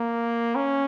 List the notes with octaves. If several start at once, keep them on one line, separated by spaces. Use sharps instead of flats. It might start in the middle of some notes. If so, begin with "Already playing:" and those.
Already playing: A#3
C#4